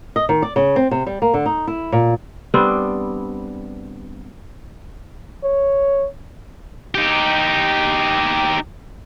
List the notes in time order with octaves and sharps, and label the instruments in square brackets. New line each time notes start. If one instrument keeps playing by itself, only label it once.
[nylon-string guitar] D#5
D#3
D5
C#3
C4
C3
G3
A#3
D3
D#4
E4
A#2
[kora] G3 B3 C4 D4
[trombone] C#5
[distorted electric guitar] D#4 G4